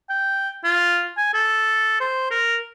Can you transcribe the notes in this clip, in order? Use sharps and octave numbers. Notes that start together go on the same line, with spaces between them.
G5
F4
G#5
A4
C5
A#4